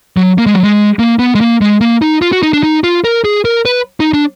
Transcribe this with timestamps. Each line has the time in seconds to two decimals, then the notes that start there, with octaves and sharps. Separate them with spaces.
0.17 F#3
0.38 A#3
0.46 G#3
0.54 F#3
0.63 G#3
0.99 A#3
1.19 B3
1.35 G#3
1.41 A#3
1.61 G#3
1.81 A#3
2.02 D#4
2.22 F4
2.32 F#4
2.43 D#4
2.53 D4
2.63 D#4
2.84 F4
3.04 A#4
3.24 G#4
3.45 A#4
3.65 B4
4.00 D#4
4.14 D4